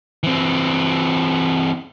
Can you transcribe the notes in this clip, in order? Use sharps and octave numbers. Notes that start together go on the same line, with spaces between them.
E3 C4